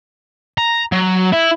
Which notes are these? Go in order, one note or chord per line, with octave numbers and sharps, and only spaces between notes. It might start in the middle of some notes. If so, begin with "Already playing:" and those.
A#5
F#3
E4